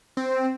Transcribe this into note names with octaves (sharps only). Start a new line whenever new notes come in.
C4